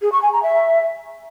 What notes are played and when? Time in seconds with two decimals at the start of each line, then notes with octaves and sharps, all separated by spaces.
0.02 G#4
0.12 C#6
0.22 G#5
0.32 A#5
0.43 E5